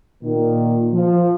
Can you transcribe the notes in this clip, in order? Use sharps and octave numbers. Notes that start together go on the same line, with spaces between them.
A#2 D#3
F3